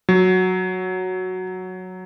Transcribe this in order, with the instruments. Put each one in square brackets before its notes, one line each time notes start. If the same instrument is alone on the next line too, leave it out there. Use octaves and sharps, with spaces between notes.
[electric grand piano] F#3